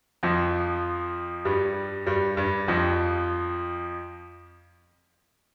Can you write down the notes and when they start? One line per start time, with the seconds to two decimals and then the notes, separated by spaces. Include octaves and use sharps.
0.23 F2 F3
1.45 G2 G3
2.07 G2 G3
2.37 G2 G3
2.68 F2 F3